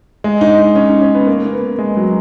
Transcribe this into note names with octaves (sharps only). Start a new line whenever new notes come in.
G#3
D#4
D#4
C#4
D#4
C#4
B3
A#3
A#3
B3
G#3
F#3